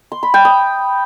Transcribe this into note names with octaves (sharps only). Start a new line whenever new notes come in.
C6
B5
G5
D#6